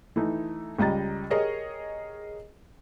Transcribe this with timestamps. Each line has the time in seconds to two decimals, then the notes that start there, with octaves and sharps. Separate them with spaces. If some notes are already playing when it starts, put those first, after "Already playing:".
0.16 E3 A3 D#4
0.79 C#2 G3 D#5 A#5 A6
1.30 G4 G#4 A#4 C#5 D#5